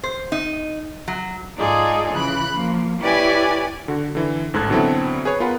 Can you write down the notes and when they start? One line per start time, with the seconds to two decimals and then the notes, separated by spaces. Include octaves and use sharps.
0.03 C5
0.32 D#4
1.08 F#3
1.58 G#2 D#4 F4 G#4 A4 D5
2.13 C#3 E3 B5 F#6
2.53 F3 A#3
3.00 E4 G4 B4 C#5 D5 G#5
3.88 D3 F#4
4.15 D3 E3
4.54 A1 G#2 A4 F#6 G#6
4.70 B2 D3 F#3 C4 E4 A4
5.25 G#4 B4 C#5
5.40 B3 F4 A#4 B4 F#5 B5